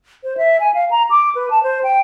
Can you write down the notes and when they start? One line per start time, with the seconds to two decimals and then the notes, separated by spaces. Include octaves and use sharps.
0.24 C5
0.37 E5
0.60 G#5
0.74 F5
0.91 A#5
1.10 D6
1.35 B4
1.50 A5
1.63 C5
1.84 G5